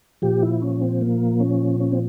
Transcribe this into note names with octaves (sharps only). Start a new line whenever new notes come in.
A#2 F3 G4
E4
C#4
C4
A#3
C#4
C#4
C4